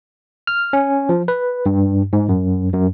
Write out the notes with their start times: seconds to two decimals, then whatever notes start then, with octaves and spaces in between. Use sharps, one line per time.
0.47 F6
0.73 C#4
1.09 F3
1.28 B4
1.66 G2
2.13 G#2
2.29 F#2
2.73 F#2